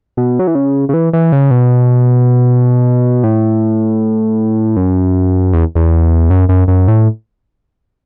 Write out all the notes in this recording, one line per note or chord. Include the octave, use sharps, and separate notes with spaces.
B2
F#3
E3
C#3
C#3
E3
E3
C#3
B2
A2
F#2
E2
E2
F#2
F#2
F#2
A2